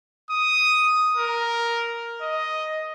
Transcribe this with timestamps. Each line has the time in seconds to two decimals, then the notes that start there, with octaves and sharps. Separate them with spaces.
0.30 D#6
1.17 A#4
2.21 D#5